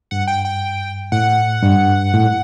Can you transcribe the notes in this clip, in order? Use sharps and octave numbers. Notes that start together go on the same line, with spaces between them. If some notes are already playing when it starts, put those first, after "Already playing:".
G2 F#5
G5
G5
A2 F#5
G2
A2